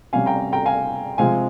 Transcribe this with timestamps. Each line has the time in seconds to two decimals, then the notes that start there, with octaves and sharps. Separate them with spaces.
0.13 C3 G3 C#4 F5 G#5
0.26 G5 A#5
0.53 G5 A#5
0.65 F5 G#5
1.18 C3 F3 G#3 C4 F5 G#5